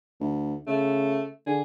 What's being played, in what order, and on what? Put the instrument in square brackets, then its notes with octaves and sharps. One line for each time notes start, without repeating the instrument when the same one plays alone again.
[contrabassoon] D2
[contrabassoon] C#3 [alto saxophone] A3
[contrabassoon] D3 [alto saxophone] G#4